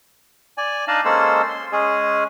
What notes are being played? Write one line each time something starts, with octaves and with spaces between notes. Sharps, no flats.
D5 G#5
D4 D#4 D5 D#5 F5 A5
G#3 A#3 C#4 A4 C5 E6
C6
G#3 C#4 G#4